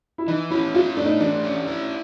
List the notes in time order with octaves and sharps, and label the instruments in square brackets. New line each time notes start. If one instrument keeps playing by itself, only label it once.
[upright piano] E4
[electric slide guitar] E3 [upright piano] D#4
[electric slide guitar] C#4 [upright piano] E4
[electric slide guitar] E4 [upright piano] F4
[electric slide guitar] A3 [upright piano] D4
[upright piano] D#4
[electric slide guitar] E3 [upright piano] D4
[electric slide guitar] C#4
E4